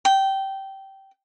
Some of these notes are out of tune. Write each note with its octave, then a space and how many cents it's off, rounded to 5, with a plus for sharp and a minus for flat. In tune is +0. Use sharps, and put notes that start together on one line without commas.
G5 -15